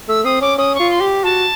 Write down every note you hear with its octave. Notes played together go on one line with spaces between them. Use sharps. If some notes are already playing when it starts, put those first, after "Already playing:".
A3 E6
C4 D#6
C#4 D6
C#4 D#6
C#6
F4
C6
G4
F#4 A5